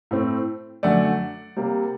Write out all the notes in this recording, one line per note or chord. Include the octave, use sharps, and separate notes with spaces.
A2 A3 C4
F#2 D3 A3 D5 F#5
C3 G3 A#3